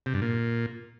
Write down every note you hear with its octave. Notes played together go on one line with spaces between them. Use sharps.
C3
G2
A#2